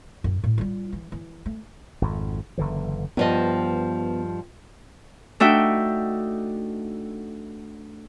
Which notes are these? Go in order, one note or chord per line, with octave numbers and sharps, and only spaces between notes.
F#2
A2
G3 F4
E3
E3
A3
G#1 F2
F#1 D3 E3
G2 F3 B3 D#5
A3 D4 D#4 F#4 E5 G5